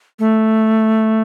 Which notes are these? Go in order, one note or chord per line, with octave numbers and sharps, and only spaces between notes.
A3